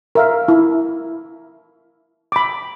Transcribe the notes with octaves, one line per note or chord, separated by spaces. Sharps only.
A#4 E5 F5
E4
B5 D6